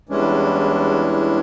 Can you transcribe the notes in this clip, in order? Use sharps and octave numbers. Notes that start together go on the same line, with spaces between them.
E2 E3 G3 G#3 C#4 D4